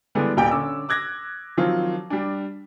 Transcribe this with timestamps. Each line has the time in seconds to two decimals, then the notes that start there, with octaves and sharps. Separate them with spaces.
0.15 D3 E3 G3 G#3 B3 D4
0.37 D#1 A#2 G4 G5
0.51 D3 C#4 D6 E6
0.89 D6 F#6 G#6 A#6
1.57 D#3 F3 F#3 C4 F4
2.10 G3 D4